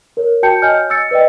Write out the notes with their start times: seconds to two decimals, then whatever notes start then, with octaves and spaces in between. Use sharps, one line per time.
0.17 A#4 C#5
0.43 F#4 G5 A5 G6 C#7
0.62 C#5 D#5 G#5 F6 G6
0.90 E6 A6 C#7
1.11 B4 D5 D#5 G5